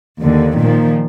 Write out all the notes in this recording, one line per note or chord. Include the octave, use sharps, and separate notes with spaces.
D#2 D3
A#2 D#3 F3